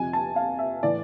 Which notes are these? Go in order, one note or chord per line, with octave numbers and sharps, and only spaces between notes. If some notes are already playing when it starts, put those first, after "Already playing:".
Already playing: F2 C3 F3 G#5
A5
F5
E5
A2 E3 D5